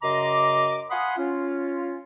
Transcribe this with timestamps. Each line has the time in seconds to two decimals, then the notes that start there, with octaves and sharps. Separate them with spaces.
0.02 F#2 C#3 D#5 A#5 C6 D6
0.90 F5 F#5 G#5 B5 C6 D#6
1.18 C#4 F4